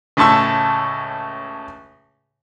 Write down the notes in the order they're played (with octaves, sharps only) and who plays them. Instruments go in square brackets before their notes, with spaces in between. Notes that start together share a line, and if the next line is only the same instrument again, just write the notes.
[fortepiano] C#2 A2 A5 C#6 E6